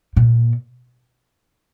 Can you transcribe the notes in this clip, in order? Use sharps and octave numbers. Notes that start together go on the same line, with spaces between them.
A#2